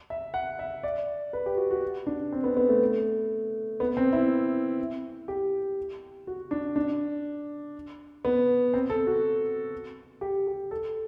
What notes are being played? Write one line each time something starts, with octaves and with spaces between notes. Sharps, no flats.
E5
F#5
E5
D5
B4
G4
F#4
F#4
D4
C4
B3
B3
A3
B3
C4
E4
G4
F#4
D4
D4
B3
C4
A4
F#4
G4
G4
A4